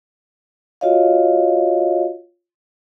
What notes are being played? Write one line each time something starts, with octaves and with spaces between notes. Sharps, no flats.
F4 F#4 C#5 D#5 F5